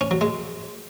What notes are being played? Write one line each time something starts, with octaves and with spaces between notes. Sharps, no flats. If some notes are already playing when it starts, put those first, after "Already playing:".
C#4
F#3
G#3